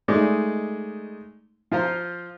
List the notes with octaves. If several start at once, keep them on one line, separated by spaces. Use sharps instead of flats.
G#3 A3 D#4 D5
F3 F4 C5 A#5